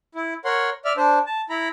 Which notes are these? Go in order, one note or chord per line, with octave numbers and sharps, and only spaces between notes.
E4
A#4 C#5 F#5 C6
D5 E5 F6
D4 C5
A5
E4 A#5 B5